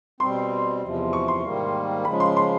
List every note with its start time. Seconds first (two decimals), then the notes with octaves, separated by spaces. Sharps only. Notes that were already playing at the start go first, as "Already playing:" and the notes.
0.20 B2 G3 C4 C6
0.82 E2 C3 F3
1.13 C#6
1.28 C6
1.44 G#2 D#3 G3 A#3
2.05 C#3 F3 G#3 B5
2.20 C6
2.37 C6